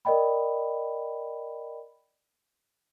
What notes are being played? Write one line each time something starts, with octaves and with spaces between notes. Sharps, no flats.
A#4 D5 D#5 G5 B5